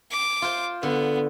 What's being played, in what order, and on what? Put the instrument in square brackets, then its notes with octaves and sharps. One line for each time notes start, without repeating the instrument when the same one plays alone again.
[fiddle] D6
[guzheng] F4 C5
[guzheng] D3 [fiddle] B3